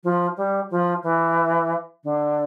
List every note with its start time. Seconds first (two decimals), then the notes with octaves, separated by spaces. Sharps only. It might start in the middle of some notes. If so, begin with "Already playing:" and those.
0.04 F3
0.37 G3
0.70 F3
1.03 E3
2.04 D3